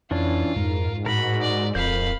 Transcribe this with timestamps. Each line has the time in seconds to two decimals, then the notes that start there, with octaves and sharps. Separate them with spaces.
0.11 F2 E3 C#4 D4 F4
0.56 F2 G#2 A#4
1.06 A2 F#4 A#4 B5
1.42 D5
1.75 D1 F2 A#4 F5 B5 G6